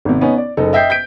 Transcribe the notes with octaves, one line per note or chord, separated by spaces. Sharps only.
G#1 C3
B3 C#4 D#4
D5
F#1 D#4 A4
D#5 E5 G5 G6 C7
G6 B6 D7